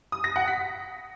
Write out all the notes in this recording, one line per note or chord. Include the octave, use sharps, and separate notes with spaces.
D#6
A#6
F#5
B6